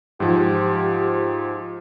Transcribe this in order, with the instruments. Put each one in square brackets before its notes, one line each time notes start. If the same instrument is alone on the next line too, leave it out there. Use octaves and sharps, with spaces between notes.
[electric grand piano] G#2 F3 [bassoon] G4